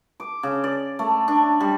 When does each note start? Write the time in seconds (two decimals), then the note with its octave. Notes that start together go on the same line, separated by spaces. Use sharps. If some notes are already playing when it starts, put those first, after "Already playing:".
0.20 D6
0.43 C#3
0.64 D5
0.99 A3
1.28 D4
1.60 G3